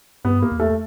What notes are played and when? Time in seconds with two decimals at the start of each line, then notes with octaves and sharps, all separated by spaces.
0.24 G2 B3
0.42 A#3
0.51 E2
0.60 A3